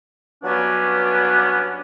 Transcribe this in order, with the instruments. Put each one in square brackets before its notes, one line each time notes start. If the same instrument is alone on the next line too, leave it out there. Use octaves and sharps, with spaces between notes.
[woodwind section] G2 F#3 B3 C#4 D4